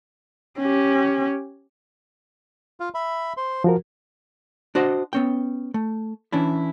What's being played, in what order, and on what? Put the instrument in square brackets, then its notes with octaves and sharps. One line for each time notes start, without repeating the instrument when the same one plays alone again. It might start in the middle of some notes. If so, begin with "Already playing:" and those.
[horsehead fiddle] C#4 G4
[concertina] F4 F5
E5 B5
C5 C6
[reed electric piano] F3 F#4 A#4
[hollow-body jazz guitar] D4 F#4 C5 D#5
B3 C#4 G5
A3
E3 C#4 D4 E4